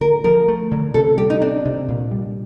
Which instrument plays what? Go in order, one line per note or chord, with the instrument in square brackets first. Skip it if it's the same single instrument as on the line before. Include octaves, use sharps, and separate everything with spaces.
[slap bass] D3 [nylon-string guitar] A#4
[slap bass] F3 [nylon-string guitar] A#4
[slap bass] A3
D3
[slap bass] C3 [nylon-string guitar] A4
[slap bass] G3 [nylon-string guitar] G4
[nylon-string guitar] D#4
[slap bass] C4 [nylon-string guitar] D4
[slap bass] C3
A#2
G3